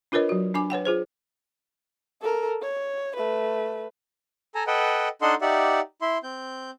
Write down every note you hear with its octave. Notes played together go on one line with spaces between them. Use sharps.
D4 F4 A#4 B4 C#5 D#5
F#3 F#4
D4 G#5 D6
B4 C#5 F#5 G5
F4 G#4 C5
A4 A#4
C#5
A3 B4
A4 G#5 A#5
A4 B4 D#5 F#5 G5
D4 D#4 A4 D#5 F#5 C6
D#4 G4 D5 E5 F#5
E4 E5 C6
C4 G6